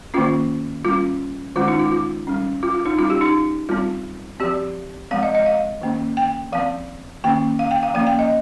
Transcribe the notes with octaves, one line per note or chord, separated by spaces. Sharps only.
D#3 A#3 C#4 F4
G3 C#4 F4
D#3 G#3 C#4 F4
D#4
F4
F4
G3 C#4
F4
F4
D#4
G3 C#4 F4
G4
D#4
G3 C4 F4
F3 C4 G4
F3 G#3 C4 F5
D#5
D#5
F5
D#3 A#3 C#4
G5
F3 C4 F5
D#3 A#3 C#4 G5
F5
G5
F5
F3 A#3 C#4 F5
G5
D#5